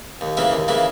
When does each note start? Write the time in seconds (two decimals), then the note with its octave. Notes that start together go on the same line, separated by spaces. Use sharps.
0.21 D#2
0.37 C#3 E3 A#3 E4
0.52 D#2
0.68 C#3 E3 A#3 E4